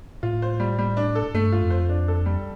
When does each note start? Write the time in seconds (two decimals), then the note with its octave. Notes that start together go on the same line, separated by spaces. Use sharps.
0.23 A2 F4
0.42 C5
0.60 G3
0.79 G3
0.97 D4
1.15 A4
1.34 G2 A3
1.52 F4
1.62 F2
1.70 C5
1.89 D4
2.08 A4
2.26 G3